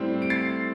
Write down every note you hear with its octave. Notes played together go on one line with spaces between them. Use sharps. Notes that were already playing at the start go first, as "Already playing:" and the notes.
Already playing: A2 G3 C4
D7
A6 C7